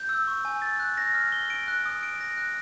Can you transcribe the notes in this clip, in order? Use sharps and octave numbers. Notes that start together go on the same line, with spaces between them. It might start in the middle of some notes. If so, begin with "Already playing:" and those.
Already playing: G6
E6
C#6
G#5
A6
F#6
A#6
F6
G7
D7
F#6
D#6
D7
A#6
F#6